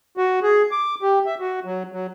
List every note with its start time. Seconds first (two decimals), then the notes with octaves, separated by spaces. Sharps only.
0.17 F#4
0.43 G#4
0.71 D6
1.02 G4
1.26 E5
1.40 F#4
1.65 F#3
1.92 F#3